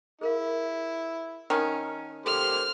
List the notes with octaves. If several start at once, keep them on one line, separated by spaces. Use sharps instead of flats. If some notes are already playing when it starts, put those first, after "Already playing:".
E4 G#4 A#4 F5
D#3 C#4 A5 D#6 E6
A#3 G4 A4 C5 A#5 F6